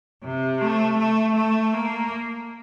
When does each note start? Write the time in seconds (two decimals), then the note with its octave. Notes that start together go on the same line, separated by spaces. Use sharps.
0.23 C3
0.61 A3
0.98 A3
1.36 A3
1.73 A#3